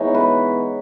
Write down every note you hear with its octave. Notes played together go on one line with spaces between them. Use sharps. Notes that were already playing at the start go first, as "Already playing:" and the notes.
Already playing: E3 G#3 B3 D#4 C#5
B4